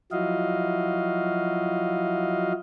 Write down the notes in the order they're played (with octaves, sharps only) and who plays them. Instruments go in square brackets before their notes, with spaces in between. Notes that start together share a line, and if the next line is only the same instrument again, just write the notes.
[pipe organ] F3 F#3 E4 F#4 D#5 F5